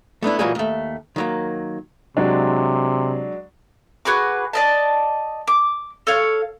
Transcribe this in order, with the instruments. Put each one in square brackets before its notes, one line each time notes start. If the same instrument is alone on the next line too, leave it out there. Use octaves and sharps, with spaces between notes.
[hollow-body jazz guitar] A3 B3 D4 E4
A#2 E3 F#3 G3 A#3 G#4
D#2 A3
D#3 F#3 A#3
[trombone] C3 [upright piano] F#3 G#3 D4
[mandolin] F#4 G#4 B4 D6
D5 D#5 A5
D6
A4 C#5 F5